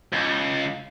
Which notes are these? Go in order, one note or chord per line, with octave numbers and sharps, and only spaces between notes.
C#2